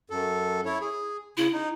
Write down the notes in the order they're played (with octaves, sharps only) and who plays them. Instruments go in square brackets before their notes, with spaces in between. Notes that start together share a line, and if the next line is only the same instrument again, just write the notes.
[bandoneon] F#2 A4
E4 C#5
G#4
[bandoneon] C#3 [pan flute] E4
[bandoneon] D#4